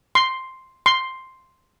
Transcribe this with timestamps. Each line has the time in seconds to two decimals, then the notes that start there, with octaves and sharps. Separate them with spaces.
0.15 C6
0.86 C6